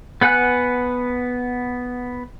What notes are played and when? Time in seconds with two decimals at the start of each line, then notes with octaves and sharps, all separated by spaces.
0.21 B3 B4 F#5 G#5 F#6